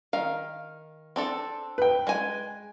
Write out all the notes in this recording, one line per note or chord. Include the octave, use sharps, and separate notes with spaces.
D#3 F5
C4 D4 A4
B4 G5
G#3 G#5